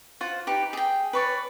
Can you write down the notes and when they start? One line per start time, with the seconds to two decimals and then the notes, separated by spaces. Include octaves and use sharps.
0.21 F4 C5 F#5
0.47 D#4 G4 B4
0.73 G#4 G5
1.13 B4 C#5 D5